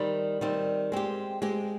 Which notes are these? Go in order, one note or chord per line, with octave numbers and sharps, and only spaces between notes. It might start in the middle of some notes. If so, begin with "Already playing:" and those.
Already playing: D#3 G3 C4
D#3 G3 C4
G#3 C4 G4
G#3 C4 G4